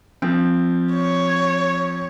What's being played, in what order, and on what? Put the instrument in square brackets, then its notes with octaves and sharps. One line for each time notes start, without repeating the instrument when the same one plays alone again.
[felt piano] F3 C4
[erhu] C#5